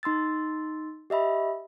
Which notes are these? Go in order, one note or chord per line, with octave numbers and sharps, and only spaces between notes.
D#4 C6 E6 A6
G4 D#5 E5 B5